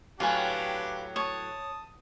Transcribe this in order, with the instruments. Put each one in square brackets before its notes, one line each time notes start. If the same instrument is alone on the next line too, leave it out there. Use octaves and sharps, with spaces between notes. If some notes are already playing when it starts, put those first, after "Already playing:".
[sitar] A2 F#3 B3 [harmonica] D4 G4 [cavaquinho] F4 B4 G#5
[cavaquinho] C#5 [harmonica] A5 D#6